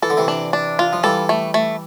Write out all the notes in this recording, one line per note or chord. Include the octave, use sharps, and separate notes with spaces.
E3 A4
D3
C3 E3
D4
D4
F4
F3
E3 G3 A4
A3
A3